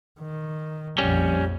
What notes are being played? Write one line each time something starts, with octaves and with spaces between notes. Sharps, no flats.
D#3
A#1 F2 G3 C#4